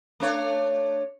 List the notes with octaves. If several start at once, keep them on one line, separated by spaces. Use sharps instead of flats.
A3 D4 C#5